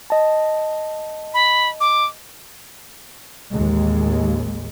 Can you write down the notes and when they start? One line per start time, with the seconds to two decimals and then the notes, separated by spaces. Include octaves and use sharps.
0.10 D#5 A5
1.34 B5
1.81 D6
3.52 A1 D#2 G#3